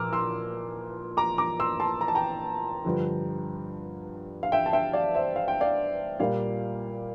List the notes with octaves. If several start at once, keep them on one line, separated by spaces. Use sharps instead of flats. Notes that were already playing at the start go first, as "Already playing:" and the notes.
Already playing: A#2 F3 A#3 A#5 D6 E6 F6
C6 E6
A#5 D6
A#5 D6
C6 E6
A5 C6
A#5
A5
G5 A#5
G2 D3 F3
F5
E5 G5
A5
E5 G5
D5 F5
C5 E5
F5
G5
D5 F5
A#2 G3 A#3 D5 F5